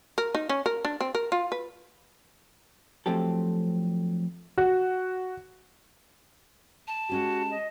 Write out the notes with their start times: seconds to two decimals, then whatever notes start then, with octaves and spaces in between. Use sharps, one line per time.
0.18 A#4
0.35 D#4
0.49 C#4
0.66 A#4
0.85 D4
1.01 C4
1.15 A#4
1.32 F4
1.52 B4
3.06 F3 F#3 A3 C4 G4 A4
4.58 F#4
6.87 A5
7.09 G#3 C#4 F#4 G4
7.51 D#5